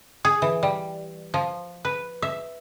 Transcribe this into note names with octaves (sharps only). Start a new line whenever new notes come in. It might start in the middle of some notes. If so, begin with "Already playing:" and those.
G#4
E3
G3
F3
B4
E5